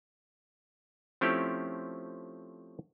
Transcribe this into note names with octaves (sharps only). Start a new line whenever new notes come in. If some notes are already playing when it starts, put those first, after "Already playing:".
F3 A3 C4 C#4 E4 G4